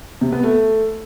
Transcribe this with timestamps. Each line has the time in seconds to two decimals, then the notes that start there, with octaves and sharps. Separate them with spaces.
0.21 C3
0.32 B3
0.44 A3